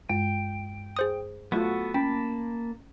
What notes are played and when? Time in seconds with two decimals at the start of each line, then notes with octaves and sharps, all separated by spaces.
0.09 G2 G#3 G5
0.97 G#4 C5 D#6
1.52 F#3 A3 B3 F4 F#4 A4
1.94 A#3 C#4 G5 A5 B5